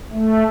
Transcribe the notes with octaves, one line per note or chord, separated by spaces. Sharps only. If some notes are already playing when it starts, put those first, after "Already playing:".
A3